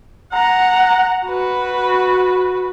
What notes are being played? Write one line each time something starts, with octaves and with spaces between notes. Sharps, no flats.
F#5 A#5
F#4 B4